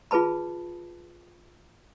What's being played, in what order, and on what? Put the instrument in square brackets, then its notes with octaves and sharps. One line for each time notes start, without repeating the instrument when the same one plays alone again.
[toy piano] F4 G#4 B4 A5 B5